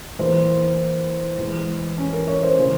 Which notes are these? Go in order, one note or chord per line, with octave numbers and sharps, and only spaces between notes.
E2 E3 A#3 C5
E2 E3 G#3
C#4
A#4
C#5
C5
C#3 E3